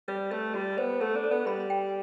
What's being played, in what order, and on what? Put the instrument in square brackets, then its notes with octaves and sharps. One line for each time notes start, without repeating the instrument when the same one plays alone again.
[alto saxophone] G3 [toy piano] B4
[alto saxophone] A3 [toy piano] B4
[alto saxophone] G3 [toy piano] F#4
[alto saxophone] B3 [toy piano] C5
[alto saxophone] A3 [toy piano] A4
[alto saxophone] D4
[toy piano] A4
[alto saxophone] B3
[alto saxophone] G3 [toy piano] B5
[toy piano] G5